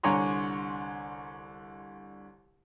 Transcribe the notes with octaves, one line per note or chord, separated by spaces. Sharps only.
C2 D3 C#5 G#5 A#5 C6